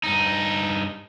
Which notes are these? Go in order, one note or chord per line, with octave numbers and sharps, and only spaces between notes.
G2 D#4